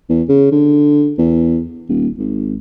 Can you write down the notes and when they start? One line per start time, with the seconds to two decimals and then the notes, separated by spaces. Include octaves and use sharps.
0.09 E2
0.28 C#3
0.52 D3
1.18 E2
1.89 D#1
2.18 G#1